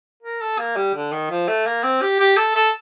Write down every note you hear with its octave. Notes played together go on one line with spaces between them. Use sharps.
A#4
A4
A#3
G3
D3
D#3
F3
A3
A#3
C4
G4
G4
A4
A4